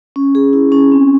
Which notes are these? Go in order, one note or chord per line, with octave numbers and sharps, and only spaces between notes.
C#4
G#4
E4
C#4
C4